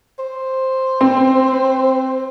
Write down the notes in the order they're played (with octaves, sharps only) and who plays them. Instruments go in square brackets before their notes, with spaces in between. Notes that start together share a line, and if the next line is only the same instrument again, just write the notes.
[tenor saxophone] C5
[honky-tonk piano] C4